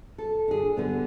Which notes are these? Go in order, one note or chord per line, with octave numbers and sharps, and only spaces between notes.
A4
D3 G#4
D3 G3 B3